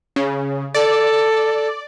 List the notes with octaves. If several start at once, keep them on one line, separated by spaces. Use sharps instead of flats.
C#3
A4 D5